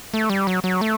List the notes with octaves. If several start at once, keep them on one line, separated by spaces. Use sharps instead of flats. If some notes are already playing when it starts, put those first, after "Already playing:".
A3
G3
F#3
F#3
A3